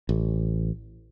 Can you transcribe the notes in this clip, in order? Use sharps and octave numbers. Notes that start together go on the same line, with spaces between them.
A1